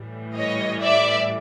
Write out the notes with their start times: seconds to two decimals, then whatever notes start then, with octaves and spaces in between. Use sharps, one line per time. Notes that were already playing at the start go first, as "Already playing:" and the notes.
Already playing: A2 E3 G3
0.36 C#5 D#5
0.82 D5 E5